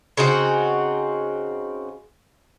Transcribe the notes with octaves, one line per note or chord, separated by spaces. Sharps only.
C#3 C4 D#4 F#4